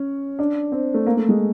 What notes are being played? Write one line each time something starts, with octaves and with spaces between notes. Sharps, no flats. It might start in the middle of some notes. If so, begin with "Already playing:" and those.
Already playing: C#4
D4
C4
A3
A#3
A3
G#3